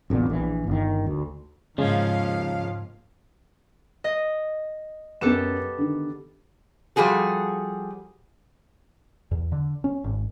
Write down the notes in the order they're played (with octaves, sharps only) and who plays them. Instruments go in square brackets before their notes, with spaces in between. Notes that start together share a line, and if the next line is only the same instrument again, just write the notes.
[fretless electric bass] D1 A1 A#2 B3
A#1 E3
G1 D#3
D2
[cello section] D#2 G#2 F5 [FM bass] C#3 [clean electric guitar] F3 C#4 [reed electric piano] G#3
[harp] D#5
[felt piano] F#2 A#4 E7 [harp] B3 G4 A4
[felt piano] D3 D#3
[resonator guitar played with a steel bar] F3 G3 F#4 G#4 A4
[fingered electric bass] E2
D3
C#4
G#1